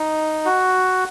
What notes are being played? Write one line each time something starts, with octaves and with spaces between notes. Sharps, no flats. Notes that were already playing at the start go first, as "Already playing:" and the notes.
Already playing: D#4
F#4